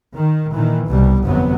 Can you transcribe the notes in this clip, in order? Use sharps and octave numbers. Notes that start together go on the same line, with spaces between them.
D#3
A#2 D#3 E3
C2 B2 G3
G1 F2 C3 F#3 B3